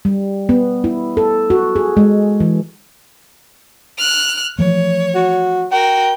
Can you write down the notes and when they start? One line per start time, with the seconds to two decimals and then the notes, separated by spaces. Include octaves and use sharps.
0.05 G3
0.49 B3
0.84 E4
1.17 A4
1.50 F#4
1.76 G#4
1.97 G#3
2.40 E3
3.98 F6 F#6
4.59 E3 F3 A3 C#5
5.15 F#4
5.72 F#4 A#4 G5